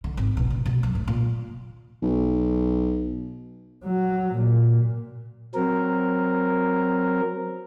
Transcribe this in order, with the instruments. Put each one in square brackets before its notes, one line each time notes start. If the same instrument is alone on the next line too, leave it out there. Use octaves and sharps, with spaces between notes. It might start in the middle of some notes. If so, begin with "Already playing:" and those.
[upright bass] D3
G#1
B2
A#2
B2
F#2
A2
A#2
[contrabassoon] B1
[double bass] F#3
A#2
[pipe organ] F#3 C4 A#4